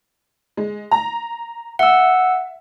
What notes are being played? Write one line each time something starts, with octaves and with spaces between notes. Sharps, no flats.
G#3
A#5
E5 F#5 E6